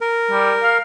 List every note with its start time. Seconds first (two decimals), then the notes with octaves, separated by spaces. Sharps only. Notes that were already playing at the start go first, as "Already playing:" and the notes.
0.01 A#4
0.31 G3
0.63 F5